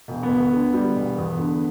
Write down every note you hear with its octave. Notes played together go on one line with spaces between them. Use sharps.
E1
B3
D2
D3
G3
E1
E2
D3